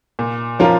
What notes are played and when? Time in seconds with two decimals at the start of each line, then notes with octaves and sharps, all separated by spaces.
0.19 A#2
0.59 F3 C#4 F4 A#4